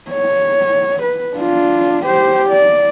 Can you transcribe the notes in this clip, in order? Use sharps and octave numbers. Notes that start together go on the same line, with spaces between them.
C#5
B4
D4 F4
G4 C5
D5